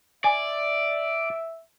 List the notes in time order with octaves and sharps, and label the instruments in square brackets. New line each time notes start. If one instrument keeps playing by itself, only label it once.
[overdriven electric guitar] D5 [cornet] E5 [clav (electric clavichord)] G#5